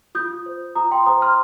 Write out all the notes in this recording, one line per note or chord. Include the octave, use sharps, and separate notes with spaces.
F4 D#6 G6
C5
F4 A#5 D#6
G5 C6
C5 A#5 D#6
C6 F6